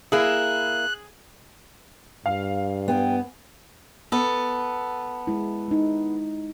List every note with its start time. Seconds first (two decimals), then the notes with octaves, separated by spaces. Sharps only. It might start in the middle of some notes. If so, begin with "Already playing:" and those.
0.12 A#3 E4 G#4 F#6
2.26 G2 F5
2.88 B3 G5 G#5
4.12 B3 A4
5.27 G#3 E4
5.68 G#3 D#4